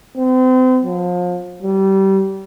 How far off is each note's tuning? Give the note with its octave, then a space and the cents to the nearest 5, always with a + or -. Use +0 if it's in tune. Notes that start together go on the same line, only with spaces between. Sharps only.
C4 -35
F3 +35
G3 -25